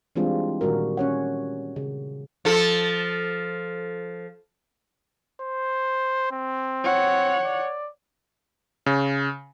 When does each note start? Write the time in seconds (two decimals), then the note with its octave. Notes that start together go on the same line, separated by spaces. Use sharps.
0.16 E3 G3 G#3 C4 D4 F4
0.61 A#2 D#3 G3 F#4 A#4
0.97 C#4 C#5 F#5
1.76 C#3
2.45 F3 A4
5.41 C5
6.32 C4
6.84 C#5 F#5
7.45 D5
8.86 C#3